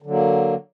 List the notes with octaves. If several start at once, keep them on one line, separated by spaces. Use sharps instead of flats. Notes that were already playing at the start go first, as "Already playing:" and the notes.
D3 F#3 A#3